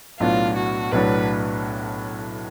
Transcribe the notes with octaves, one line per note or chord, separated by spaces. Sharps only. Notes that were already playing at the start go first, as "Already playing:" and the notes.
B1 A2 F#3 B3 D4 F4
F#4
B1 A2 F#3 B3 D4 B4